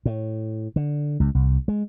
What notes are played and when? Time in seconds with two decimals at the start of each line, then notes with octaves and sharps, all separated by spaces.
0.06 A2
0.76 D3
1.20 C#2
1.35 C2
1.68 G#3